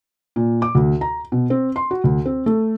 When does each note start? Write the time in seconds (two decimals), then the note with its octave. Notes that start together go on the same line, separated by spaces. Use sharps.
0.36 A#2
0.62 D6
0.75 D2
1.01 A#5
1.32 B2
1.50 C4
1.76 C6
1.91 F#4
2.04 D2
2.26 C4
2.46 A3